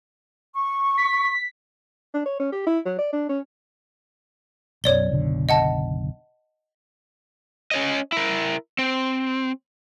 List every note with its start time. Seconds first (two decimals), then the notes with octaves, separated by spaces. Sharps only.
0.53 C#6
0.98 B6
2.14 D4
2.26 C#5
2.40 C#4
2.52 G4
2.66 E4
2.85 F#3
2.99 D5
3.13 D4
3.29 C#4
4.84 B1 F#2 C#5 D5 G7
5.10 F#1 B1 D3
5.49 D#5 F#5 A5
7.71 C#4 C#5 D#5
8.12 E4 A#4
8.79 C4